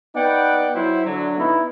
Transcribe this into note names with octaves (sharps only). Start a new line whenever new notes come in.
B3 D#4 B4 D5 F#5 G5
F#3 E4 C5
D3 F#3
B3 D#4 E4